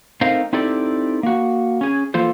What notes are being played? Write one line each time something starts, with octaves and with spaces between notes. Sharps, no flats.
A3 C4 D#4 A#4 C5 F5
C4 D#4 E4 G4 A4 D5
A#3 F#4
C#4 G#4
E3 A#3 F4 A4 C5